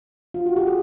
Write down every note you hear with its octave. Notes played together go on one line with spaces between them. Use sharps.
F4
F#4
G4
G#4